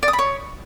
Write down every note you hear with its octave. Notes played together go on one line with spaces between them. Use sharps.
D5
D#6
B5
C#5